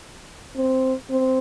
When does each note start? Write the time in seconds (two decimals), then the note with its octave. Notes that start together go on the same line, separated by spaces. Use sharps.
0.56 C4
1.10 C4